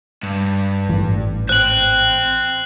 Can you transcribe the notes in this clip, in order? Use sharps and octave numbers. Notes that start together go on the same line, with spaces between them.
G2
G#1 A2 E3
C5 G5 F#6 F#7